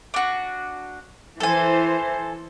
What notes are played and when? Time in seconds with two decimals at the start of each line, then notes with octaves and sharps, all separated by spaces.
0.14 D4 F#4
1.40 E3 A4 C5 G#5